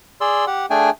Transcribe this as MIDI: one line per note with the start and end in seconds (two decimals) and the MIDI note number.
0.21 0.45 68
0.21 0.45 74
0.21 0.45 84
0.21 0.45 88
0.47 0.66 67
0.47 0.66 78
0.70 0.90 57
0.70 0.90 62
0.70 0.90 68
0.70 0.90 79
0.70 0.90 80